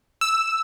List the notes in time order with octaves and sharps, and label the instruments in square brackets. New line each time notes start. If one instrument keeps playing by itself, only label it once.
[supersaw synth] E6